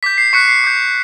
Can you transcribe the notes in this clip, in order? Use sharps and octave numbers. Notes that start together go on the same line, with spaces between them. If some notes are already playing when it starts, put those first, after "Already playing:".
D6 G6 B6
C7
C#6 F#6 B6 C#7
C7
D6 G6